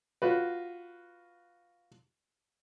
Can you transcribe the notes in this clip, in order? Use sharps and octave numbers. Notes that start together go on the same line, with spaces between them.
F4 F#4 B4